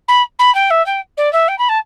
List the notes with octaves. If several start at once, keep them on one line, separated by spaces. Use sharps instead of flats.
B5
B5
G5
E5
G5
D5
E5
G5
B5
A5